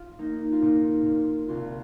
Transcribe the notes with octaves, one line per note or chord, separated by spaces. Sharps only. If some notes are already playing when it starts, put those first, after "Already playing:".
Already playing: F4
A#3 D#4
F4
A#2 D#4
A#2
C2 F4